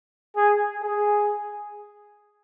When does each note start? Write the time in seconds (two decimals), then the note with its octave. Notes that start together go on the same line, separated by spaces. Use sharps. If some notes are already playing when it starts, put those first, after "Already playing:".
0.37 G#4
0.83 G#4